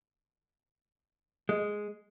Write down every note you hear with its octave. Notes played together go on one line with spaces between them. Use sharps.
G#3